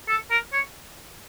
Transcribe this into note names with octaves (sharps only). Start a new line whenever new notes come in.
A4
A#4
C#5